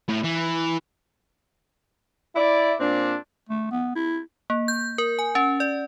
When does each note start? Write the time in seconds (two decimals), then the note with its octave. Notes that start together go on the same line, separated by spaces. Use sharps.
0.09 A2
0.24 E3
2.36 E4 D5
2.80 A#2 C4 D4
3.49 A3
3.71 B3
3.96 E4
4.50 A#3
4.68 G6
4.98 A#4
5.19 G#5
5.35 C#4
5.60 D5